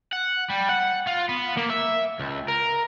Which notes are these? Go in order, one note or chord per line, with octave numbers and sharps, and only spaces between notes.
F#5
G3
F#5
F4
B3
A#3
E5
C#2
A#4